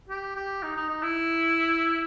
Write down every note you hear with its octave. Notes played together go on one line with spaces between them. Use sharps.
G4
G4
D#4
D#4
D#4
E4